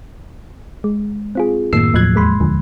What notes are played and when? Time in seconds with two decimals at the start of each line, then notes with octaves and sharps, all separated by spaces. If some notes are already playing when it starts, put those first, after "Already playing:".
0.84 G#3
1.35 C4 F4 G#4
1.73 F#2 A2 D#3 A#3 E6 C7
1.94 D#2 A2 F3 F#3 F#6 G#6
2.15 E2 G#3 B5 C6
2.40 D2 D3 F3